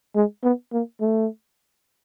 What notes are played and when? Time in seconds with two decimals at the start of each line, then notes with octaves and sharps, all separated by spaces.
0.15 G#3
0.44 B3
0.73 A#3
1.01 A3